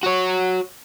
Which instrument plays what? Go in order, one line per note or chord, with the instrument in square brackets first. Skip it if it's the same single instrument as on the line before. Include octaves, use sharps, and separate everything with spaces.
[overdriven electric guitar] F#4 C#5